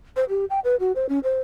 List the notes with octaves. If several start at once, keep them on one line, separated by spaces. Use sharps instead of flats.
C5
G4
G5
B4
F#4
C5
C#4
C5